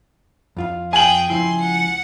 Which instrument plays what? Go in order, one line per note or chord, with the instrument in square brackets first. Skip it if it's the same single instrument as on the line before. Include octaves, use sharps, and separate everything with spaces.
[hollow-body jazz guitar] F2 F4 F5
[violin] G#4 G5 [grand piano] G#5 F#7
[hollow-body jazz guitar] C#2 F3 E4 [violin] C6
[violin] F#5